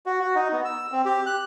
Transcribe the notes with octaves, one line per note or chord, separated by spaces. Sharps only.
F#4
F#4
D#4
B3
E6
C4
G4
F#6